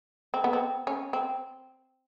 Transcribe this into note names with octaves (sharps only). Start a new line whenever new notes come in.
C4
B3
C4
C#4
C4